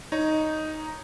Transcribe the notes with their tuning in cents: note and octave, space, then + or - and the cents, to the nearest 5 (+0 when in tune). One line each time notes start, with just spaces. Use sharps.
D#4 +0 C#5 +0